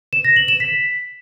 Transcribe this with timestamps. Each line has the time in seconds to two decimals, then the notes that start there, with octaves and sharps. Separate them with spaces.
0.13 E7
0.25 A#6
0.36 F#7
0.48 E7
0.60 B6